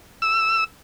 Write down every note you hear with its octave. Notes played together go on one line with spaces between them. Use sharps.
E6